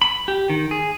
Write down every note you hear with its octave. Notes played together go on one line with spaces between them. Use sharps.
B5
G4
D#3
G#4